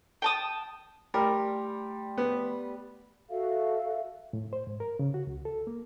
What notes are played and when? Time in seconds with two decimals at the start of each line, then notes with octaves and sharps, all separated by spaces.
0.22 G5 A5 D#6
1.14 G3 A3 A#4 C6
2.18 B3
3.30 F#4 A4 E5 F5
4.33 A2
4.53 C5
4.67 G#2
4.80 A#4
4.99 C#3
5.14 F#4
5.27 C#2
5.45 A4
5.67 A#3